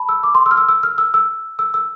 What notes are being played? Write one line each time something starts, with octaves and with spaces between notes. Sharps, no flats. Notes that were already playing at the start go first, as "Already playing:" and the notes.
Already playing: A5 B5
E6
D6
C6
E6
F6
E6
E6
F6
E6
E6
E6
E6